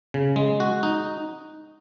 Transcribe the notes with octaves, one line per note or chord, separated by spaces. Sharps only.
C#3
G#3
F#4
D#4